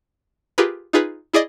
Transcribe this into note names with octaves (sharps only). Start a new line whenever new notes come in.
F4 G4 G#4 A#4 B4
D#4 F4 G#4 B4
E4 G#4 D5 D#5